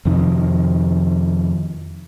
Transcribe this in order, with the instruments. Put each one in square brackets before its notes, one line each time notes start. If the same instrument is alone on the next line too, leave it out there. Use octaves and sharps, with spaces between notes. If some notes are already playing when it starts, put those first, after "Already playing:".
[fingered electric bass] F2 C3 D#3